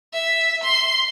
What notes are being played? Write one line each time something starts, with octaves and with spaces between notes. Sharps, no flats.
E5
C6